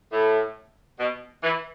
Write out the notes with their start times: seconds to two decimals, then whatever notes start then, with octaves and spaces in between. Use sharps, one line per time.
0.13 A2
0.99 B2
1.43 E3